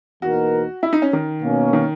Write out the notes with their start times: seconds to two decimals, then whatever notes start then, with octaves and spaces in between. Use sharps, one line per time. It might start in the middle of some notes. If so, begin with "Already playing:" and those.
0.22 E2 B2 A#3 D#4 F#4 A#4
0.83 E4
0.93 D#4
1.02 C#4
1.13 D#3
1.42 B2 A#3 C#4
1.73 D#3